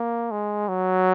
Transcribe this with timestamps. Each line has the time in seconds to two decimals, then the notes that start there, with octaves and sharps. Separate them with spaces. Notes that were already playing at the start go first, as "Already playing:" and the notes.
Already playing: A#3
0.31 G#3
0.69 F#3